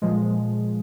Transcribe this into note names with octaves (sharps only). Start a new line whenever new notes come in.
A#2 F3 G#3